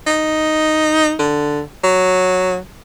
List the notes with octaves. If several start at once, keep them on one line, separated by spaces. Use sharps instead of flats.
D#4
D3
F#3